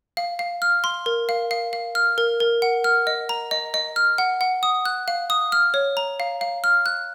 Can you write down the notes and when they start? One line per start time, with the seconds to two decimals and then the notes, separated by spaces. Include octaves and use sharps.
0.17 F5
0.39 F5
0.62 F6
0.84 C6
1.06 A#4
1.29 F5
1.51 F5
1.73 F5
1.95 F6
2.18 A#4
2.40 A#4
2.62 F#5
2.84 F6
3.07 D#5
3.29 A#5
3.51 D#5
3.74 D#5
3.96 F6
4.18 F#5
4.41 F#5
4.63 D#6
4.85 F#6
5.08 F5
5.30 D#6
5.52 F6
5.74 C#5
5.97 A#5
6.20 F5
6.41 F5
6.64 F6
6.86 F#6